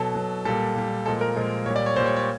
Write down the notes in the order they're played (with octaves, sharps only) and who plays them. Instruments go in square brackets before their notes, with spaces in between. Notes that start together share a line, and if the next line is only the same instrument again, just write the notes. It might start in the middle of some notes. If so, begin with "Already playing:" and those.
Already playing: [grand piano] B2 F#3 A4
B2 F#3
A#2 G3 A4
A#2 G3
A#2 F3 G#3 A4
A#4
A#2 F3 G#3
A#2 G3 C#5
D5
C#5
A#2 G3 C5
C#5
C#5